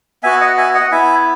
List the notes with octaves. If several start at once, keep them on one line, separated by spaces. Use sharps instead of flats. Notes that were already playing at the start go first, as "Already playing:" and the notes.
B3 F#4 E5 G#5
D#5 F#5
E5 G#5
D#5 F#5
B3 E4 E5 G#5